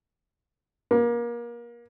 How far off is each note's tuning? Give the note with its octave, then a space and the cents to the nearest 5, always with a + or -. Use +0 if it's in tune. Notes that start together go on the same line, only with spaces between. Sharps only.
A#3 +30